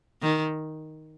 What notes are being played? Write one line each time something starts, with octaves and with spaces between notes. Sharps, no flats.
D#3